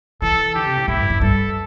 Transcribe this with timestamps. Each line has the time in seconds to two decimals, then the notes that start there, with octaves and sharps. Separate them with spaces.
0.22 E3 A4
0.55 D3 G4
0.66 C3
0.77 A2
0.88 A2 E4
0.99 G2
1.10 G2
1.21 G2 A4